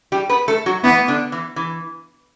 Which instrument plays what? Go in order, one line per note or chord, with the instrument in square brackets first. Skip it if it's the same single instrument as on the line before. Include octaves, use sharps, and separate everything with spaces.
[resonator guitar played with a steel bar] G3 G4
B3 B4
A3 A4
F#3 F#4
[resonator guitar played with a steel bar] E3 E4 [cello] B3
[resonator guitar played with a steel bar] D3 D4
E3
E3